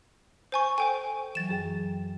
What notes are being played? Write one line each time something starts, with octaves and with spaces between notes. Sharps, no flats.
C5 G#5 C#6
A4 C5 G5 G#5
E3 F#3 A6 E7
F#2 G#4 G5